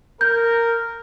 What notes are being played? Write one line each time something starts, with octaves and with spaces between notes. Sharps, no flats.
A#4 G6